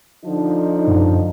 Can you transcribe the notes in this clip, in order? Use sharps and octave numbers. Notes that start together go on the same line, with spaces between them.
D3 F3 D#4
F#2